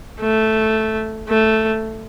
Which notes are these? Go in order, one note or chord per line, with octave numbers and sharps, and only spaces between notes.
A3
A3